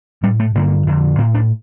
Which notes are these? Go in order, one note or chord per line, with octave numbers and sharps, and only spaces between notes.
A2 G3
A3
G2 D3 A#3
F2 D3
A2 A#3
D4